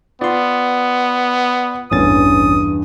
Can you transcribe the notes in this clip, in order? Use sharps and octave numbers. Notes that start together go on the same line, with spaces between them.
B3 F4 D5 C6
A1 E2 G2 C#4 D#6 A6